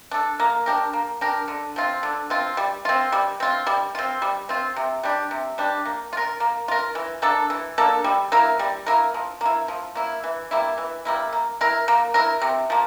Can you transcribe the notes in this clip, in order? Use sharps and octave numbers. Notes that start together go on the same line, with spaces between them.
D4 A4
A#3
D4 G4 A#4
A#3
D4 G4 A#4
D3
F3 C4 F4
D3
F3 C4 F4
G3
C4 F4
G3
C4 F4
G3
C4 F4
G3
C4 F4
C3
G3 D4 G4
C3
G3 D4 G4
A#3
F4
A#4
A#3
F4 A#4
E3
A#3 D4 A4
E3
A#3 D4 A4
G3
A#3 E4 A#4
G3
A#3 E4 A#4
F3
A#3 E4
F3
A#3 E4
E3
G3 A#3 E4
E3
G3 A#3 E4
A#3
E4 A#4
A#3
E4 A#4
C3
F3 A#3